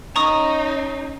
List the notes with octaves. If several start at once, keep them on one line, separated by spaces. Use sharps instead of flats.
C#4 D#4 A#5 C#6 D#6